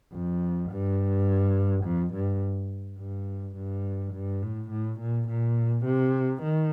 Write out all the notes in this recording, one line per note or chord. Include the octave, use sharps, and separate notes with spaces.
F2
G2
F2
G2
G2
G2
G2
A2
A2
A#2
A#2
C3
D#3